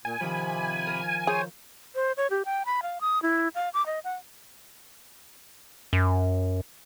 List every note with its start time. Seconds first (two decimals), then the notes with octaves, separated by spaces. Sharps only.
0.05 A#2 G#5
0.20 C3 D#3 F3 B5
0.87 A#4
1.27 G#4 C5 C#5
1.95 C5
2.17 C#5
2.30 G4
2.45 G5
2.66 B5
2.83 F5
3.01 D#6
3.22 E4
3.55 F5
3.74 D6
3.86 D#5
4.04 F#5
5.93 F#2